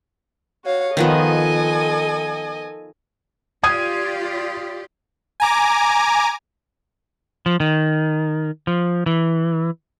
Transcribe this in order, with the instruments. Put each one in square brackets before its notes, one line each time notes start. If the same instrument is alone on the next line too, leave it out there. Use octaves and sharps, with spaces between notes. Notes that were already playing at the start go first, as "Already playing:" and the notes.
[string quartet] F#4 C#5 F5
[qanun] D#3 F3 B3 [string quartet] A4 D#5 G#5
[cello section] F4 G4 D5 [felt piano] D#6 G#6 D#7
[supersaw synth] G#5 A#5 D6
[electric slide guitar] F3
D#3
F3
E3